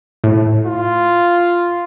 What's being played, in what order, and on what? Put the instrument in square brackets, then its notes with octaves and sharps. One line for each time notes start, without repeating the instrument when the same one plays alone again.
[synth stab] A2
[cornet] F4